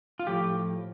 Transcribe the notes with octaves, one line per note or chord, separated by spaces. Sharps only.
F4
A2 F3 G4